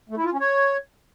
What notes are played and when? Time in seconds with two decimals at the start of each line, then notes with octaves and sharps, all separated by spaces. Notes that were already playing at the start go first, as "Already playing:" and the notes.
0.09 A3
0.17 E4
0.25 F4
0.32 C#4
0.40 C#5